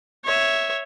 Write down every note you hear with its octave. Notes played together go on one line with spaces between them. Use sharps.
C#5 E5